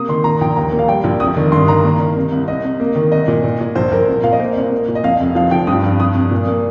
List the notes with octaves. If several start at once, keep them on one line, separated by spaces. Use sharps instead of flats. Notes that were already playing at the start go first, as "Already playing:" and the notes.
Already playing: C3 A#3 D#6
D#3 C6
A#2 A#5
A#1 G5
D#2 A#5
A#3
F5
G3 G5
A#1
F1 D#6
D#3
G2 C6
D#3 A#5
A#3
D#3
C3
C2
C2 D#5
C3
A#3
D#3
C2 D#5
A#2
A#2
A#2
A#1 C5
A#1 A#4
C2
A#2 F5
D#5
A#3 C5
C2
A#3
A#2
D#5
F2 F5
F1
F3 F5
F3 G5
G2 D#6
G2
F2 D#6
C3
A#2
A#3